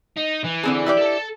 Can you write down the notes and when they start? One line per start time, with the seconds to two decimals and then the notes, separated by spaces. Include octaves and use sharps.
0.17 D#4
0.44 E3
0.63 D3 C4 G#4
0.86 E4 G4 D5
0.98 A4 A5